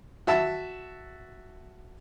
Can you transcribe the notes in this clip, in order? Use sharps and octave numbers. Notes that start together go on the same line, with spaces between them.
F#4 E5 A5 E6